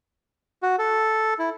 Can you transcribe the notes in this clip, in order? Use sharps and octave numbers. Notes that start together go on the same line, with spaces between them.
F#4
A4
E4